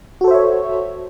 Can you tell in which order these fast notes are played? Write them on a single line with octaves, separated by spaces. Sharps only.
F#4 A4 C5 E5 C#5